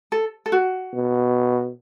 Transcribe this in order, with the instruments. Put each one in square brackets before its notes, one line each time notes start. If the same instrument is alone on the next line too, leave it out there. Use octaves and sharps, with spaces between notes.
[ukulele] A4
A4
F#4
[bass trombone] B2